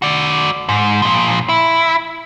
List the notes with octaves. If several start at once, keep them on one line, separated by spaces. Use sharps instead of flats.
F#4 D5
G#2
A#2 F3
E4